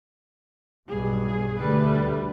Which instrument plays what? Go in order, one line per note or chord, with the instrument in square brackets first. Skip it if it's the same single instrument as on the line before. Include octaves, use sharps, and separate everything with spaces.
[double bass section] B1 G2 B2 [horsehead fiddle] G#4
[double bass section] D2 D3 A3 [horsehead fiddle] G3 B4